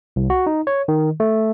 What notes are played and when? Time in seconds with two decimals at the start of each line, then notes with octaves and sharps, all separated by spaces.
0.16 C2
0.30 F#4
0.47 D#4
0.67 C#5
0.88 D#3
1.20 A3